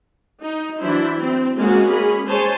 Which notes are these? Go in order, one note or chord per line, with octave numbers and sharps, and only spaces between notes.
D#4
E3 F#3 D4 E4 C5
C4
G#3 A#3 C#4 F#4 G#4
C#4 G#4 B5
G#3 C5 C#5 G#5 A5 C6